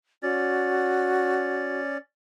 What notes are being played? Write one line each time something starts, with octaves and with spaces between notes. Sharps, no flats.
C#4 F#4 D5